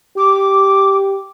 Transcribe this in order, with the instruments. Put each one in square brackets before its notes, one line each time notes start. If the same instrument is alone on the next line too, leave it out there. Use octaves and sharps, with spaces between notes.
[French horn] G4 [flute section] D6